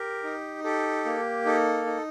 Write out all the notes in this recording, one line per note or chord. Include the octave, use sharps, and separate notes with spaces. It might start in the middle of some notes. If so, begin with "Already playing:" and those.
Already playing: G4 A#4
D#4
G4 A4
A#3
D#4 A4
D#4